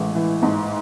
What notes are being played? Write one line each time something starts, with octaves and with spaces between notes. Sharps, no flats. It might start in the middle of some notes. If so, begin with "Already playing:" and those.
Already playing: A1 G#3
E3
G#2